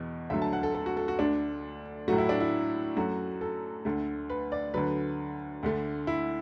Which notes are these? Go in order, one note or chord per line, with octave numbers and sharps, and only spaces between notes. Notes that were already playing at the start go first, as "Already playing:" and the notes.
Already playing: E2 B2
D2 D3 F#3 A3 E5
A5
F#5
A4
A4
F#4
A4
F#4
D2 D3 A3 D4
A2 F#3 A3 F#4
E4
D4
E4
F#2 F#3 A3 F#4
A4
D2 D3 A3
B4
D5
D2 D3 F#3 B4
D2 D3 A3
E4